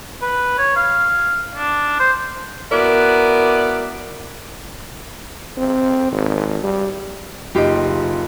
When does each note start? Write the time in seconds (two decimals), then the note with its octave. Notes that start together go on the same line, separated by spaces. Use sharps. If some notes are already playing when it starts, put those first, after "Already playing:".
0.22 B4
0.58 C#5
0.76 F5
1.55 D4
2.00 C5
2.72 B3 E4 F#4 A#4 D5
5.57 C4
6.12 G#1
6.64 G3
7.55 F#1 D#4 F4 G4